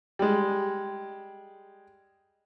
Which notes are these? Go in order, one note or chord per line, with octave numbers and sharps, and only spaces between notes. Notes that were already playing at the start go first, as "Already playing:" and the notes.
G3 G#3